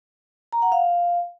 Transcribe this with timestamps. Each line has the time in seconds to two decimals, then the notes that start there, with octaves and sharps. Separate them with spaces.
0.53 A#5
0.62 F#5
0.72 F5